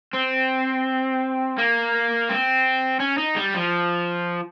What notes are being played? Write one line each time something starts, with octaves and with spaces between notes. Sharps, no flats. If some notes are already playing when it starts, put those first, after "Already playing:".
C4
A#3
C4
C#4
D#4
G3
F3